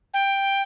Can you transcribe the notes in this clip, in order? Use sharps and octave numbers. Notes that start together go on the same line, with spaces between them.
G5